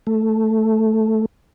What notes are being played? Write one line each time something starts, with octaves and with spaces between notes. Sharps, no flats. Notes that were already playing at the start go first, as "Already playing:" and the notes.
A3